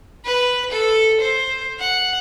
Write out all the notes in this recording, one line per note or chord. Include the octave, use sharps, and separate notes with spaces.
B4
A4
C5
F#5